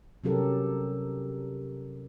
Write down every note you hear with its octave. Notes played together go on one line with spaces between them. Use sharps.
C3 F#3 C#4 G4 A4 A#4